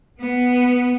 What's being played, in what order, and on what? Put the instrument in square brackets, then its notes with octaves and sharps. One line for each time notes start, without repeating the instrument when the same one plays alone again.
[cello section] B3